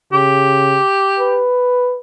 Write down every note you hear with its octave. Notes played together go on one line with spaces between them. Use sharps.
C#3 G4
B4